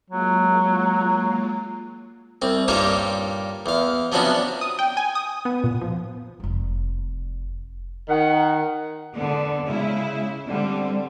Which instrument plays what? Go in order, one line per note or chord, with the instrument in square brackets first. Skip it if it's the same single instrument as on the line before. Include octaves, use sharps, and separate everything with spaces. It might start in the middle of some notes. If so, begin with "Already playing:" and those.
[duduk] F#3 [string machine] G#3 A#3 F4
[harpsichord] C2 C4
G2 A#2 A#3 D#4 G4 C#5
E2 F5
C3 F3 F#3 B3 C#4 D4
[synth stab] D#6
G5
G#5
D#6
B3
A#2
F3
[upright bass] F1 G3
[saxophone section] D#3 F#5
[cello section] E2 D3 B3
C#3 G#3 E4
D3 G3 C4